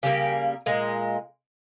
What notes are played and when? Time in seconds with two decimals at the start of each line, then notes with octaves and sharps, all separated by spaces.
0.03 C#3 G3 A#3 G4
0.66 A#2 G#3